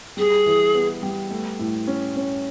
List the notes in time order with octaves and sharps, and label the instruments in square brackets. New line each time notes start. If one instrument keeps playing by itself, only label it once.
[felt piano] G3 [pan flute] G#4
[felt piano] E3
B3
G3
A3
A2
C#4
C#4